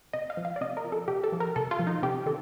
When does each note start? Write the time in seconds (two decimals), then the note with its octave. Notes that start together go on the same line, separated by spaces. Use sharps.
0.13 C3 D#5
0.30 F5
0.37 F3
0.45 F5
0.56 D5
0.61 C3 D#5
0.77 A#4
0.84 F3
0.92 A4
1.08 C3 G4
1.24 A4
1.32 F3
1.40 A#4
1.56 C3 A4
1.71 F4
1.79 F3
1.87 D#4
2.03 C3 G4
2.26 D#3 A4